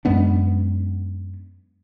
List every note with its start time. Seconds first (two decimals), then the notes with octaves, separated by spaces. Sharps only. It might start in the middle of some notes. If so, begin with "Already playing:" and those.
0.05 F#2 G#3 B3 D4